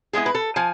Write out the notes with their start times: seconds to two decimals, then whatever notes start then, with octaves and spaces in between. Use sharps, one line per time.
0.13 G#3 B3 E4 G#4
0.26 B4
0.35 A4
0.56 F3 G#5